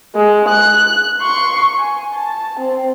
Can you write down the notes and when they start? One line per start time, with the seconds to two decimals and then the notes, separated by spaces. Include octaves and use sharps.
0.15 G#3
0.48 F#6
1.21 C6 C#6
1.78 G#5
2.13 A5
2.59 C4